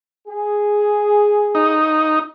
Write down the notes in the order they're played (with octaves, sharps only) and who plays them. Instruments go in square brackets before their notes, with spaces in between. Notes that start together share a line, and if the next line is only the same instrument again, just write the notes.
[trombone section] G#4
[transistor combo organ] D#4